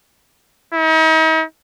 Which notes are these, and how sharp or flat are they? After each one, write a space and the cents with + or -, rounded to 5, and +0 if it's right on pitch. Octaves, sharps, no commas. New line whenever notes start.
D#4 +45